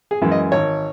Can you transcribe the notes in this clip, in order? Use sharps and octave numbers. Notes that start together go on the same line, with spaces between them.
G#4
F#2 E3 G#3
D#5
G#1 C#5